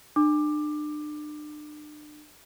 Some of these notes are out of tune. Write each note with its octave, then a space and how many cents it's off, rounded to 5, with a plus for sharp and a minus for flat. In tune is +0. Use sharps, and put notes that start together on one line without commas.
D4 +40 D6 +15